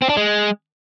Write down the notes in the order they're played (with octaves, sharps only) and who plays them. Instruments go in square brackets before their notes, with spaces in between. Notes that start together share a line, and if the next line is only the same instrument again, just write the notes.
[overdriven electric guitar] C4
D4
G#3